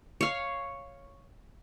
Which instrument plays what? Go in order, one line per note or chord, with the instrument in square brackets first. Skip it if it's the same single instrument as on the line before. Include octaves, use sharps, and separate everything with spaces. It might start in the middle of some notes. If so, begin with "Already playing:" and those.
[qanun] C#5 F5